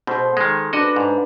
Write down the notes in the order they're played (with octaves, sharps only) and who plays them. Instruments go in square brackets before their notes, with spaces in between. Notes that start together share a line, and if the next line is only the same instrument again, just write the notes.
[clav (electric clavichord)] B2 [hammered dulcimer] A4 C5
[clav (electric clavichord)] D#3 G#3
[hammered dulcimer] D4 B4 [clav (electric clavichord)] F#4 D#5
[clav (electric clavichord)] G#2